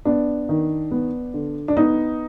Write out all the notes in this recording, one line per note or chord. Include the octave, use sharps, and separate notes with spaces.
B3 D4
D#3
B3
D3
D4
B3 D#4